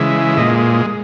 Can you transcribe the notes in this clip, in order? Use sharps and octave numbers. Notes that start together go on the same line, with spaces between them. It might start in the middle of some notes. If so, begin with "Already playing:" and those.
Already playing: C#3 E3 G#3 E5
A#2 G#3 D#5